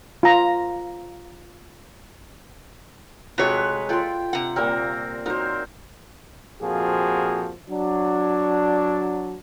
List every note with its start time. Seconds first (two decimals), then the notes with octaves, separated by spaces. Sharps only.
0.23 F4 A#5
3.38 C3 G#3 F#4 G4 A4 B4 C#5
3.89 F4 A4 D5 G5 C6
4.33 C3 F#5
4.56 A#2 G3 A#3 C4 A#4
5.26 F#3 D#4 A#4 C5 A#5
6.62 F2 A#2 F3 F#4 G#4
7.69 F#3 D4